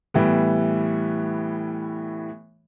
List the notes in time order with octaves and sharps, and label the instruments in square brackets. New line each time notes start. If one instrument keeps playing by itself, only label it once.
[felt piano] A2 E3 G3 B3